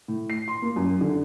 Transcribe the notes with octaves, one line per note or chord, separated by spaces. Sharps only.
A2
C7
C6
A#3
F#2
D3